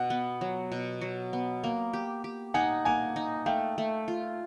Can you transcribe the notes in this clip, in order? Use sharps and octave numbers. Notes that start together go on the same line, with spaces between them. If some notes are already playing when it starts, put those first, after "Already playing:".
Already playing: B2 F#5
B3
F#3
B2
F#3
B3
A#3
G4
G4
D#4 F#5 G#5
A#3 F#5 G#5
D#4
A3 F5 G5
A3
F4